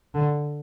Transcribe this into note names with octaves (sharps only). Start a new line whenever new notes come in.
D3